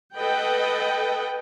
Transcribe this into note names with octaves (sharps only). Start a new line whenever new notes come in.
A4 B4 D#5 F#5 G5